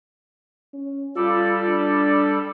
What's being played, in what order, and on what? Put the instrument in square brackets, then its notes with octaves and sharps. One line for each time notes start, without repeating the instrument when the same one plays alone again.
[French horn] C#4
[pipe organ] G3 A4 D5 [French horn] F4
[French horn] D4